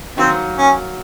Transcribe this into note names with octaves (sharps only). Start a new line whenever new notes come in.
D#3 F#3 A#3 C4 D#4
C#4